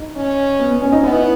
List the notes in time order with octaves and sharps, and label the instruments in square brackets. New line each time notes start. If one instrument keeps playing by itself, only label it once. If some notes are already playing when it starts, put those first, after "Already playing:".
Already playing: [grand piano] D#4
[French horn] C#4
[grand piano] B3
C#4
D#4
[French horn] B3 [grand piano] E4